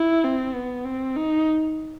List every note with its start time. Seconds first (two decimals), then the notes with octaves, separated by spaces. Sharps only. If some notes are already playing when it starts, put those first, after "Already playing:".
Already playing: E4
0.24 C4
0.54 B3
0.85 C4
1.17 D#4